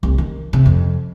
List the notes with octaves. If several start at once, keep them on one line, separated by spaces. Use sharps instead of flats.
C2
D#3
C3
F2